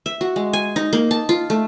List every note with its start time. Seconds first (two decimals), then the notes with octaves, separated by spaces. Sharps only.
0.06 E5
0.21 F#4
0.36 G#3
0.53 G#5
0.76 D#4
0.93 A#3
1.11 A5
1.29 F4
1.50 A3